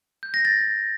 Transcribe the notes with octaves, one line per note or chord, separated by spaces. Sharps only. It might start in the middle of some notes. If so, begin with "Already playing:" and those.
G6
A#6
A6